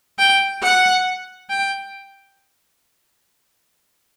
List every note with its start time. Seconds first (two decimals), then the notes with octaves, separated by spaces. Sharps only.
0.19 G5
0.63 F#5
1.50 G5